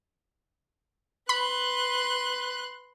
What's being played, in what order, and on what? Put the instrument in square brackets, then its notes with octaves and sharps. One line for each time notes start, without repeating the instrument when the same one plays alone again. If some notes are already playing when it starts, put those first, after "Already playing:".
[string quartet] B4 [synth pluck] B5 [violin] C6 F#6